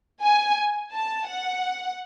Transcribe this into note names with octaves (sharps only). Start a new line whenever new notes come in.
G#5
A5
F#5